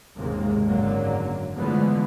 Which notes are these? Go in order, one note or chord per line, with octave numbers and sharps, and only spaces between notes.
F#1 D#2 G#2 C3 G#3 A#3
G#1 F#2 D3 F#3 A#3
D3 E3 F3 G#3 A3 B3